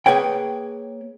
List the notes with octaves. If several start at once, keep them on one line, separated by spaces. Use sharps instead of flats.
A#3 G#4 B4 C#5 G5